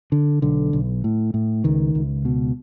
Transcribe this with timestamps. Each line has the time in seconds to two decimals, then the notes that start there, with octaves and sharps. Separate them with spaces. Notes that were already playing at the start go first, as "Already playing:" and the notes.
0.12 D3
0.42 B1 D3
0.73 B1
1.04 A2
1.34 A2
1.64 C#2 D#3
1.95 C#2
2.25 B2